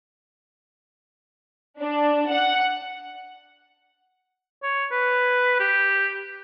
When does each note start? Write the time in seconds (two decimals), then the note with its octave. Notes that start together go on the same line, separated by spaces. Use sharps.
1.80 D4
2.30 F#5
4.63 C#5
4.91 B4
5.60 G4